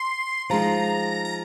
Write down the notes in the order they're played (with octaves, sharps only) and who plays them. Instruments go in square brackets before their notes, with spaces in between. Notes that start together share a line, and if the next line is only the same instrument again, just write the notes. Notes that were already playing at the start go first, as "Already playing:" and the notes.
Already playing: [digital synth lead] C6
[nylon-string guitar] F3 G#3 D#4 [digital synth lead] A#5
[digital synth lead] A#5